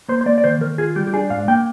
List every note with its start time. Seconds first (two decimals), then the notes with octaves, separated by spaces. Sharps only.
0.09 A#3 C5
0.21 C5
0.26 A#3 D5
0.38 D5
0.44 D#3 C5
0.61 D#3 A#4
0.78 F4 G#4
0.96 G3 G4
1.07 G4
1.13 D4 G#4
1.30 G#2 F5
1.48 A#3 G5